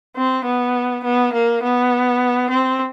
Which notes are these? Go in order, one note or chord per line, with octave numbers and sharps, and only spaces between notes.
C4
B3
B3
A#3
B3
C4